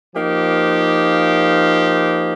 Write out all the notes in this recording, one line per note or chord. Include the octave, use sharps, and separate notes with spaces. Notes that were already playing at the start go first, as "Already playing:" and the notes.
F3 A#3 D#4 G4